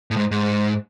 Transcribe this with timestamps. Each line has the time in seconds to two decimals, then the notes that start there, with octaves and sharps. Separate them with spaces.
0.11 A2
0.17 G#2
0.31 G#2